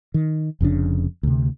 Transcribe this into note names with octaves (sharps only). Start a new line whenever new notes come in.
D#3
F1 F2 C#3 D4
D2 C3